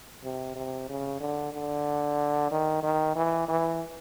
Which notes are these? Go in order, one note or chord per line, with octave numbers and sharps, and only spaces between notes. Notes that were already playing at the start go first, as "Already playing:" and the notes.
C3
C3
C#3
D3
D3
D#3
D#3
E3
E3